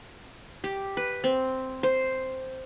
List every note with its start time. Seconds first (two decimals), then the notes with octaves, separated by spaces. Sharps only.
0.64 G4
0.97 B4
1.24 C4
1.83 C5